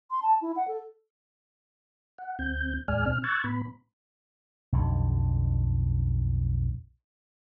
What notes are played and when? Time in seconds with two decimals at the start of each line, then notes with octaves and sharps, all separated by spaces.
0.11 C6
0.22 A5
0.42 E4
0.56 F#5
0.68 A4
2.18 F#5
2.39 D2 C4 G6
2.88 D#2 A2 G#3 D5 G#5 F6
3.06 B2 C4 F6
3.24 C#6 E6 F#6 G#6 A6
3.44 A2 B3 B5
4.72 B1 F2 D3